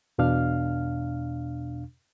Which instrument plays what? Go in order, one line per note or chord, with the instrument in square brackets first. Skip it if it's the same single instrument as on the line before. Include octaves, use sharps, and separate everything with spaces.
[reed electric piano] E2 B2 D4 F5 F6